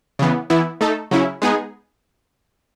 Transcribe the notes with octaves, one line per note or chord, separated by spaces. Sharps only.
C#3 E3 B3
E3 B3 E4
A3 D#4 A4
C#3 F#3 C#4 E4
G#3 B3 D#4 G#4